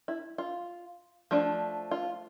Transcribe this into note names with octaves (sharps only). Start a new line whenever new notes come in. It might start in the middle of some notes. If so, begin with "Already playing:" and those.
E4
F4
F3 A3 D4
F4